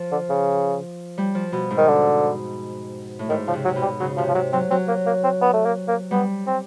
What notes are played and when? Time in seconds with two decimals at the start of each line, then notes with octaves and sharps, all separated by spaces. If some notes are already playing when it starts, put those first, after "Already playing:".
Already playing: F3
0.12 D3
0.29 C#3
1.18 G3
1.35 F3
1.52 B2
1.70 G#2
1.78 D#3
1.88 D3
3.19 A2
3.29 G#2 D#3
3.47 C#3 F3
3.53 C3
3.65 F#3
3.68 C3
3.76 B2
3.82 G3
4.00 C#3 F#3
4.17 C3 F3
4.28 F3
4.35 C3 F#3
4.53 F#3 C4
4.70 F#3 C4
4.88 A#3
5.06 A#3
5.24 C4
5.41 B3
5.54 A3
5.65 A#3
5.88 A#3
6.11 G3 B3
6.47 C4